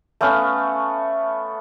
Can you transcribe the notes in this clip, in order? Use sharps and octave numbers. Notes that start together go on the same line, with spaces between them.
A3 B3 C#4 F5